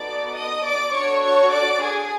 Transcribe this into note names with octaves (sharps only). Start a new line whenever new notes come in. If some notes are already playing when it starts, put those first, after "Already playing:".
Already playing: B3 D#4 F#4 A4 D5 D6
D#5 D#6
D5 D6
D4 F#4 A4 C#5 C#6
C#5 C#6
D5 D6
G#4 G#5